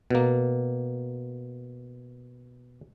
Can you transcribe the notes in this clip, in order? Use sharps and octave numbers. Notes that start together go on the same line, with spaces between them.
B2 A#3